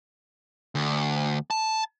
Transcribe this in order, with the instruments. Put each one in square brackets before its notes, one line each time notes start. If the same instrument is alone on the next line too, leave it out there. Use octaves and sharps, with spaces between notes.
[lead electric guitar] D2
A5